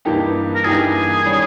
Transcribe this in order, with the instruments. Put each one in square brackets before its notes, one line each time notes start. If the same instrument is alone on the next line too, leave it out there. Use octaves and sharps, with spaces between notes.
[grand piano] G2 E3 A#3 D#4 G4
[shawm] A#4
[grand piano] G2 E3 A#3 D#4 G4 [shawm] G#4
[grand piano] D#3 G3 C#4